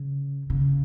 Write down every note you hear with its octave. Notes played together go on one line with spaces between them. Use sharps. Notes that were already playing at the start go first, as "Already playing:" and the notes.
Already playing: C#3
C#3